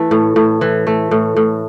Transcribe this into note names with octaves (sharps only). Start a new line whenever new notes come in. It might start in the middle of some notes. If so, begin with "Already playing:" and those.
Already playing: E3 A3
A2
A2
E3
A3
A2
A2